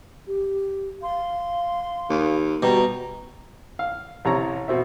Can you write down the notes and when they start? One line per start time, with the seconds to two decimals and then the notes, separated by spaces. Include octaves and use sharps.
0.27 G4
1.02 F5 C6
2.10 D#2
2.63 B2 G3 F#4 A#5
3.79 F5
4.25 A1 C3 C#5 A#5
4.68 B2 C4 E5